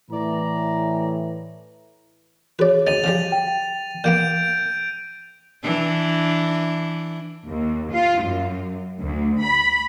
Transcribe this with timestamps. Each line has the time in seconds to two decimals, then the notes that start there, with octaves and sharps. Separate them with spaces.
0.11 A2 E3 E4 D5 A#5
2.59 F#4 G#4 B4 C#5 D5
2.87 D2 D#4 A6 D#7 F7
3.04 C#3 F3 G3 F7
3.32 G5
4.04 A#2 A#3 B3 G6 D7
5.63 E3 D4
7.46 D#2
7.90 F4
8.23 F#2
8.99 D2
9.41 B5